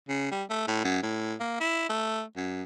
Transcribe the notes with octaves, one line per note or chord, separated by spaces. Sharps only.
C#3
G3
A3
A2
F#2
A2
A#3
E4
A3
F#2